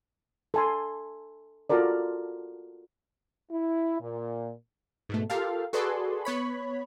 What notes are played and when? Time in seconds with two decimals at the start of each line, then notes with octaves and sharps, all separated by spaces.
0.54 A4 G#5 C6
1.70 F4 F#4 A4 A#4 D5
3.51 E4
4.01 A#2
5.09 G#2 B2 A3
5.30 F4 G4 A4 A#4 F5
5.73 F#4 G#4 A4 B4 D5 C6
6.25 B3 C#5 B5